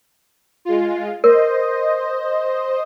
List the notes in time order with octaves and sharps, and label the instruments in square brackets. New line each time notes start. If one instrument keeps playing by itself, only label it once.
[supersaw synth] G#3 F4
[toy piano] A#4 [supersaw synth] C5 D#5